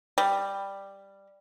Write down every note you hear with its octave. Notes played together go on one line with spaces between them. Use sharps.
G3